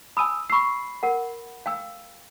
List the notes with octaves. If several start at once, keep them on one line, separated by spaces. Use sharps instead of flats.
G#5 B5 D#6 E6 D#7
B5 C#6 E6 C7
A#4 F#5
F5 G5 E6